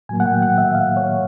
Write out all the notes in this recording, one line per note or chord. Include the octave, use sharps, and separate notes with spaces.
A2 F#3 A#3 G#5
F#5
G5
F#5
E5
F5
C#5